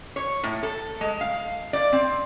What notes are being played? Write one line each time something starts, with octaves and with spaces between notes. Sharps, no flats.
C#5
A2
A4
G#3
F5
D5
C4